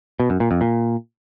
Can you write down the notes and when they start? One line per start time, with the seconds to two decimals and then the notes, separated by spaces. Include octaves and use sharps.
0.20 B2
0.30 F#2
0.40 A#2
0.51 F2
0.61 A#2